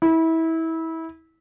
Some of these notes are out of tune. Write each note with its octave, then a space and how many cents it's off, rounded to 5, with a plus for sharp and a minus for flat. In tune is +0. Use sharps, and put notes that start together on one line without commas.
E4 -25